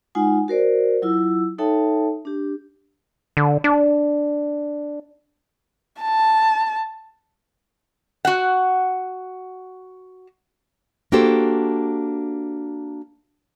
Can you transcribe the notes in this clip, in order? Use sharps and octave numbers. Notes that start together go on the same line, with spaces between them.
G#3 D#4 F4 F#5 G#5
F#4 A#4 C5 D5
F#3 E4 F4 E6
D#4 A4 C#5 E5 G5 A5
D4 G4
D3
D4
A5
F#4 F#5
A#3 D4 F#4 G4 A4 C5